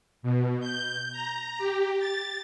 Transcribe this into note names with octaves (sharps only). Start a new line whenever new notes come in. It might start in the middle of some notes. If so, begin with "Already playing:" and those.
B2
G6
A#5
G4
A6